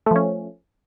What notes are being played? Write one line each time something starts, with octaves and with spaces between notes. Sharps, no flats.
F3 A3 C#4